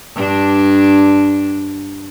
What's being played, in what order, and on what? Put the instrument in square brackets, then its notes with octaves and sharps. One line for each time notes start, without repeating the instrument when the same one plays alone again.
[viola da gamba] G2 D4